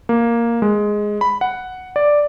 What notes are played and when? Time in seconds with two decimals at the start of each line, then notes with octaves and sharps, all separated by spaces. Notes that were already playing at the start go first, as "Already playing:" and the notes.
0.09 A#3
0.62 G#3
1.21 B5
1.41 F#5
1.96 D5